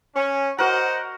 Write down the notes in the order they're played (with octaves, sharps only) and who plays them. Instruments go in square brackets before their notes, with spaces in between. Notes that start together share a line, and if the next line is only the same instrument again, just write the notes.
[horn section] C#4
[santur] F#4 A#4 [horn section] C5 D#5 F#5